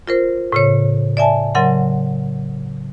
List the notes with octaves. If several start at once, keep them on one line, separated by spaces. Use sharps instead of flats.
F4 A#4 C5
A2 C#3 C#5
D5 E5 G#5 A5
C#3 F#3 A#4 F#5 C6